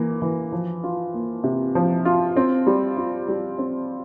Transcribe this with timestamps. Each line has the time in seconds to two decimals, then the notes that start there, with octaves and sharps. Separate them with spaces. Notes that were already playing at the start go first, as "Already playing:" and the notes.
Already playing: E3 A#3
0.22 E3
0.52 F3
0.83 F4
1.14 A#3
1.44 C3
1.75 F3
2.05 F4
2.37 C4
2.67 G3
2.97 F4
3.28 G3
3.58 C4